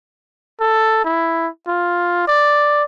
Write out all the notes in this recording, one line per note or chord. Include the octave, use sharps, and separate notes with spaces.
A4
E4
F4
D5